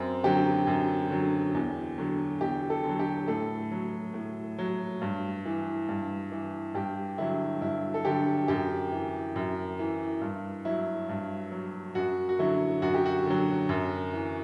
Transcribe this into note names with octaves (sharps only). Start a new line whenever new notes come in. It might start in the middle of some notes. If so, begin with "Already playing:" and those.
Already playing: F#2 C4
D3 F#3 G4
F#2
D3 F#3
E2
D3 F#3
E2 G4
A4
D3 F#3
G4
A2 A4
F#3
A2
F#3
G2
E3
G2
E3
G2 G4
D3 F#3 E4
G2 E4
A4
D3 F#3 G4
F#2 G4
E3
F#2
E3
G2
F#3 E4
G2
F#3
F#2 F#4
F#4
D3 F#3 E4
F#2 F#4
G4
F#4
D3 F#3
F#2
E3